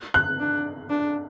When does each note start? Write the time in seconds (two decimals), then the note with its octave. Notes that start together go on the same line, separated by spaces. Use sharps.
0.14 F#6
0.40 D4
0.90 D4